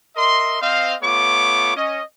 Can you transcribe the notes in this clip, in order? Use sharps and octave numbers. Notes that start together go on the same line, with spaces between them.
A#4 D#5 E5 C6
C4 C5 D#5 F5
A3 B3 F4 C#5 D6
C#4 D#5